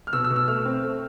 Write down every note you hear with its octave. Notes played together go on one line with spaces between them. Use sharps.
F6
B2 E6
E6
B2
E6
A3 F6
C4
A3